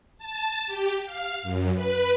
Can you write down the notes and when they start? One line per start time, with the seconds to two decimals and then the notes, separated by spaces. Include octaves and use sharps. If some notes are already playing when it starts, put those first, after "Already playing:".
0.18 A5
0.67 G4
1.06 F5
1.43 F#2
1.75 B4